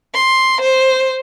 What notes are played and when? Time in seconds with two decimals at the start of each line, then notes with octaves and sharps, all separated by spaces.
0.14 C6
0.61 C5